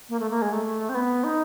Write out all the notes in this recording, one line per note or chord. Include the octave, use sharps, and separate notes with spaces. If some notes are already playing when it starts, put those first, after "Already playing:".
A#3
A3
A#3
G#3
A3
C4
B3
D#4